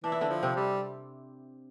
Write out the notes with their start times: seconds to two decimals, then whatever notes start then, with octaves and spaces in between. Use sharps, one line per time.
0.04 E3 D4
0.12 E4
0.21 D3 D4
0.30 F3
0.43 C3 C4
0.56 G3